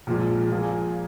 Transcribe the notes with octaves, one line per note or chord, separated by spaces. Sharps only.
A#1 A#2 F3 G#3 F4
A#2 F3 A#3 F4 G#4